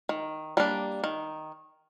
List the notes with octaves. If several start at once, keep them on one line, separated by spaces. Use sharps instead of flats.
D#3
G3 A#3 D4
D#3